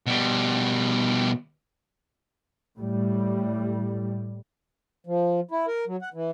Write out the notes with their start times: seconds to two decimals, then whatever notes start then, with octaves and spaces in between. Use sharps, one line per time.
0.06 B2 G3
2.78 A2 G3
5.07 F3
5.51 E4
5.67 A#4
5.87 F#3
6.02 F#5
6.14 E3